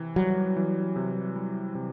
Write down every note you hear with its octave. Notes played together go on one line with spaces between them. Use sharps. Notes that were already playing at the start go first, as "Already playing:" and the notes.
Already playing: C3 E3
F#3 G3
E3
C3
G3
C3